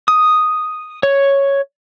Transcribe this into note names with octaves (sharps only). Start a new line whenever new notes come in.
D#6
C#5